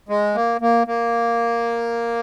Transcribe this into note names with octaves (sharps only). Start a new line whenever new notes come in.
G#3
A#3
A#3
A#3